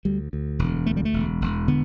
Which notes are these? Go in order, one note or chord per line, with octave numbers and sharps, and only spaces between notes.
D2 G3
D2
E1
D2 A3
G3
A3
E1
E1
D3 B3